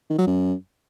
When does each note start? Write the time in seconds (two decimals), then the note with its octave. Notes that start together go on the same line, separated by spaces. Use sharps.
0.10 D#3
0.19 F#3
0.27 F#2